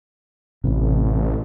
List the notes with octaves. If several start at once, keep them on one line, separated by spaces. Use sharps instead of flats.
A1 A2 C3